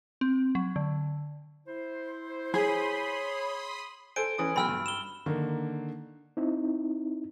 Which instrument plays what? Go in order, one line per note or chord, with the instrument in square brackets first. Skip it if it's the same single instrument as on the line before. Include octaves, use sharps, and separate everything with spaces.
[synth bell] C4
F#3
D3
[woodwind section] E4 C5
[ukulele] G#4 [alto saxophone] C#5 [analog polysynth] B5 C6 D#6
[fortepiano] A4 C5 G#5 [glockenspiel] D7
[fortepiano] E3 C#4 D#6
[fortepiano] B1 G5 [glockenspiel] B5 E6 F6
[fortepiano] G2
[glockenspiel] E7 G7
[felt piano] D3 D#3 A#3
[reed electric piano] C4 D#4 E4